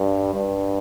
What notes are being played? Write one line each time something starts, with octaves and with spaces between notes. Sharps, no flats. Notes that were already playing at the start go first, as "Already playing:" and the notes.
Already playing: G2
G2